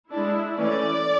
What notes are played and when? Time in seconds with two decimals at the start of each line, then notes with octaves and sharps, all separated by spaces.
0.12 G#3 D4 E4
0.57 E3 A3 C#4 D5